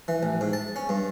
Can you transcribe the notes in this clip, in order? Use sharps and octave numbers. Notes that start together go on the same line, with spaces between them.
E3
A1
G#2
A5
C#4
G2